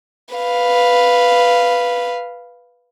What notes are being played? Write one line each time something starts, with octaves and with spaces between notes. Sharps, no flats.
B4 F5